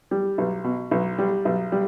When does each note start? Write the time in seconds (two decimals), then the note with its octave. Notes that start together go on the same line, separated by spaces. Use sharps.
0.11 G3
0.38 B1
0.64 B2
0.91 B1
1.18 G3
1.45 B1
1.72 G3